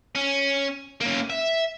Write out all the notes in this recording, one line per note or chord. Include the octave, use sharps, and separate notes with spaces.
C#4
A#3 C#4
E5